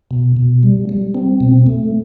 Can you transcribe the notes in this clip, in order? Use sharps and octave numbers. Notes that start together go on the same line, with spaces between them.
B2
B2
G3
G3
C4
B2
A3